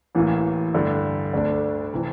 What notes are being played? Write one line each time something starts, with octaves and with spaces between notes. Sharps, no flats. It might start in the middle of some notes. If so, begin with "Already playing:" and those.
A1 A2 E3 A#3
G2 D3 A3
D2 D3 A3 D4
C3 E3